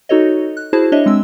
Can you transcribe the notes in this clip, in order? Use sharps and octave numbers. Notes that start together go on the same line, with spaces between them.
D#4 F#4 A4 C#5 D#5
F#6
E4 F#4 G#4 C5 A5
D4 C#5 D#5 E5
G#3 C4 D4 E6